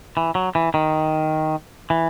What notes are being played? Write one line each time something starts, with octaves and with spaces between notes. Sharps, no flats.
E3
F#3
E3
D#3
E3